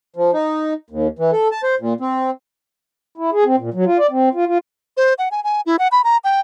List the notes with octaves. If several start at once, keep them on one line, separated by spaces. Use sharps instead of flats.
F3
D#4
D#2
E3
A4
A5
C5
A#2
C4
E4
G#4
C4
A#2
F#3
F4
D5
C4
F4
F4
C5
F#5
G#5
G#5
E4
F#5
B5
A#5
G5